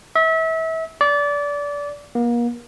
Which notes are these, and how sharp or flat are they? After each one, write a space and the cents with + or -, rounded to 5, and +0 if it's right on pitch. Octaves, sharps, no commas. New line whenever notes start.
E5 -30
D5 -25
A#3 +35